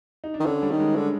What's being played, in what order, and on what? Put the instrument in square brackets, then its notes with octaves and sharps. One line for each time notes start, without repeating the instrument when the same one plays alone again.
[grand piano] D#4
D4
[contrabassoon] D#3
[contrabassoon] D3 [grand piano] C#4
[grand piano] G3
[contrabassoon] D#3
[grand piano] G#3
[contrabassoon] D3